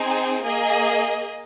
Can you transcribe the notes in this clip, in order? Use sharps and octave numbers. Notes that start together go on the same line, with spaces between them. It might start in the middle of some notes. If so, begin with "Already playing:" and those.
Already playing: C4 D#4 G#4
A#3 G#4 D#5